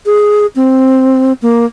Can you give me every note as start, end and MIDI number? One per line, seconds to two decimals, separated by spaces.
0.06 0.46 68
0.56 1.33 60
1.42 1.65 58